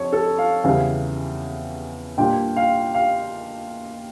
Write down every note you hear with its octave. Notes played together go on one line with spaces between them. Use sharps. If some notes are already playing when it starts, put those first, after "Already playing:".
Already playing: F2 C#5
A4
F5
E2 C#3 G3 F5
A#2 G3 D4 G5
F5
F5